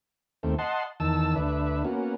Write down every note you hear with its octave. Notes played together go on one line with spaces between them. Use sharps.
D#2 A3 C4
D#5 F#5 A5 C6
E2 D#3 A5 E6
D2 D4 B4 E5
A#3 B3 C#4 F#4